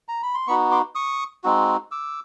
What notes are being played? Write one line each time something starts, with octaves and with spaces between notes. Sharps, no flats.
A#5
B5
C6
B3 D#4 F#4 B5 C#6
C6 D6
C#6 D#6
G#3 C4 D#4 F#4
D6 E6